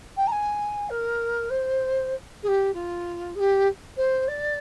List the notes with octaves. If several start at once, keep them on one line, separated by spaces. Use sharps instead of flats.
G5
A#5
G#5
A#4
C5
G#4
G4
F4
G#4
G4
C5
D5